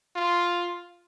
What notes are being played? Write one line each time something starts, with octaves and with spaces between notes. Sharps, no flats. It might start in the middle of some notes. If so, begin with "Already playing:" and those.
F4